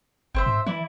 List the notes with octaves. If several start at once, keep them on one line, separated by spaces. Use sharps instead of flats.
F#1 C4 C5 E5
G#2
E3 E4 D5